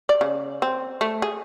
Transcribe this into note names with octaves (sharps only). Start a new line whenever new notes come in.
D5
C#3
C4
A3
G#4